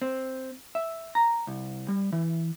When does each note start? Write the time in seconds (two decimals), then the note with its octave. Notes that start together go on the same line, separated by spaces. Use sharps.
0.02 C4
0.75 E5
1.15 A#5
1.47 C2
1.88 G3
2.12 E3